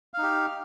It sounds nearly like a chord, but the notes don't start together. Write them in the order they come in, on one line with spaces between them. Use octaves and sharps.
F5 D#4 G4